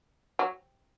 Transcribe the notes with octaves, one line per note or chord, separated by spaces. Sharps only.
F#3